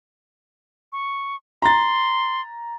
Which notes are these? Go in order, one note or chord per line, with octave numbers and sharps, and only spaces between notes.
C#6
A#5 C6 A6